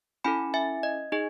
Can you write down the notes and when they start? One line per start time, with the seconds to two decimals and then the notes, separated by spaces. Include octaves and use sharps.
0.24 C#4 E4 A4 G#5 B5
0.54 E5 G#5
0.83 D#5
1.12 D#4 G#4 D#5